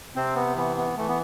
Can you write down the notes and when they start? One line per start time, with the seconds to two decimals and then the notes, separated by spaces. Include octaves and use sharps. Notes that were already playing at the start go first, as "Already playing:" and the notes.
0.16 C3 C4
0.36 B3
0.56 E3 B3
0.77 B3
0.97 E3 A3
1.08 B3